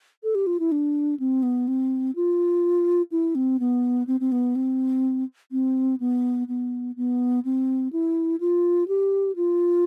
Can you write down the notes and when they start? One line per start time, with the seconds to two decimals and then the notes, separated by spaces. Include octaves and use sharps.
0.24 A4
0.35 G4
0.47 F4
0.60 E4
0.72 D4
1.20 C4
1.43 B3
1.68 C4
2.16 F4
3.12 E4
3.35 C4
3.60 B3
4.07 C4
4.20 C4
4.32 B3
4.55 C4
5.52 C4
6.00 B3
6.48 B3
6.96 B3
7.45 C4
7.93 E4
8.41 F4
8.88 G4
9.36 F4